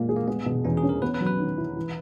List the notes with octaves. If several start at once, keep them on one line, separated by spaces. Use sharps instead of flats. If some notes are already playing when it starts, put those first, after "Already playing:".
Already playing: A#2 G#3 A#3
G#4
A#3
G#3 B3
B2
E2 C#4
G#4
C#4
A#4
B3 B4
B4
F#3
B4
D#3
E4
E3